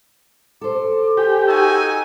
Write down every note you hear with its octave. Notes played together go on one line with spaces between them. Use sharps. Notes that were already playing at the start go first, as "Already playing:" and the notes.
A4 C5 D6
G4 G#5
D#4 F#4 G#5 E6